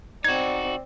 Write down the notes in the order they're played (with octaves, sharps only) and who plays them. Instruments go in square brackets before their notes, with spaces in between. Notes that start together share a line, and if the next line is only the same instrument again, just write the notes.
[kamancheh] C4 D5 [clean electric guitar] D#4 F#4 [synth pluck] G#6